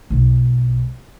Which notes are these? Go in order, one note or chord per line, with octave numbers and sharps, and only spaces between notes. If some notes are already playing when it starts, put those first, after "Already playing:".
B1 G#3